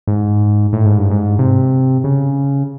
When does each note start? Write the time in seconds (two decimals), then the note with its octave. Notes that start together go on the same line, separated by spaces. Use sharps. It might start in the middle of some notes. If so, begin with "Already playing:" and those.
0.07 G#2
0.73 A2
0.86 G#2
0.98 G2
1.11 G#2
1.39 C3
2.04 C#3